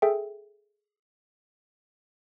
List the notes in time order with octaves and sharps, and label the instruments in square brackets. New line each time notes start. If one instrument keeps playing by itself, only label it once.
[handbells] G#4 A4 E5 G5